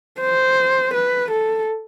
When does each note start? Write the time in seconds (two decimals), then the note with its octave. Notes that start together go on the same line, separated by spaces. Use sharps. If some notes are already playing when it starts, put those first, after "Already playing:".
0.21 C5
0.94 B4
1.31 A4